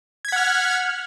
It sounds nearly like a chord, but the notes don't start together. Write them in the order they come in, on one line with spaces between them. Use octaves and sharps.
G#6 B6 F#5 F6